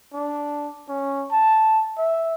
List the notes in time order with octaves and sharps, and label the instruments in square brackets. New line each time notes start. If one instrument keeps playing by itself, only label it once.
[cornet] D4
C#4
A5
E5